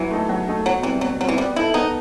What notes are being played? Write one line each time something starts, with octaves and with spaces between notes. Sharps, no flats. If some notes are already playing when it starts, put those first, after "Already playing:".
Already playing: E3 F#3
A3 D#4 A4
F#3
A3 D#4 A4
B2 F#3
E3 G3 C4
B2 F#3
E3 F#3 G3 C4
G3 B3
D#4 E4 A4
B3 D#4